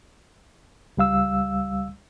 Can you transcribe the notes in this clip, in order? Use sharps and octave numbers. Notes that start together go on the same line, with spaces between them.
C#2 G3 F5 E6